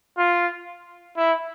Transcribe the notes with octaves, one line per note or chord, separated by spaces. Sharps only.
F4
E4